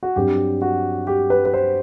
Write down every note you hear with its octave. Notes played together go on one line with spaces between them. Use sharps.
F#4
G2 F#3 C4 G4
F#4
G4
B4
B4
C5